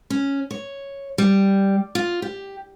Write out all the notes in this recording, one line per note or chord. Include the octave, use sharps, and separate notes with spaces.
C#4
C#5
G3
F4
G4